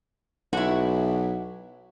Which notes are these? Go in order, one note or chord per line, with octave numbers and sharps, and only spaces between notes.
B1 E4 F#4